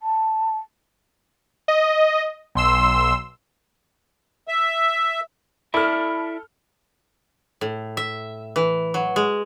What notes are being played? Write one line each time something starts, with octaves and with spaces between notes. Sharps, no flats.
A5
D#5
B1 C6 E6
E5
E4 A4 D5 E5 B5 F6
A2
E5
E3
F#3
G#3